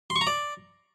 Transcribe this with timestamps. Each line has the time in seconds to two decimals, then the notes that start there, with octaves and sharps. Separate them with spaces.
0.10 C6
0.16 C#6
0.21 A#5
0.27 D5